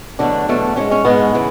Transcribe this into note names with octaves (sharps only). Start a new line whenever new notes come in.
E2 B2 D3 F#3 A3 D4
E2 B2 F#3 A3
G#2 G#3 C#4
C#4
G#2 G#3 B3
C#3 E3